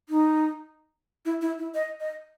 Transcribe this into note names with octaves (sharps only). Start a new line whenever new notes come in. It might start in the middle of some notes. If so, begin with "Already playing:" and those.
D#4
E4
E4
E4
D#5
D#5